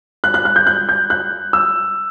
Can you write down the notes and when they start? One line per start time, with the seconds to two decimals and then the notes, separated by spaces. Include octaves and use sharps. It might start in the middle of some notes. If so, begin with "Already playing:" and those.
0.24 F#6
0.34 F#6
0.45 F#6
0.56 G6
0.67 F#6
0.89 G6
1.10 F#6
1.53 E6